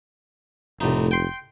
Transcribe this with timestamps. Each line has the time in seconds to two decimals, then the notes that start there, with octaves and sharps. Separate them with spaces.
0.81 F1 C2 A2 D#4
1.11 G5 C6